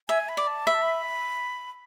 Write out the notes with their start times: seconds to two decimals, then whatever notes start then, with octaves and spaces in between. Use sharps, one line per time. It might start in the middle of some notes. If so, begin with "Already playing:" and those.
0.09 E5 G#5
0.29 B5
0.37 D5
0.47 A5
0.67 E5 B5
0.74 A5
0.82 B5